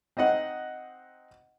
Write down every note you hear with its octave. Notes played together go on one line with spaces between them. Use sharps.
C4 D#4 D#5 F#5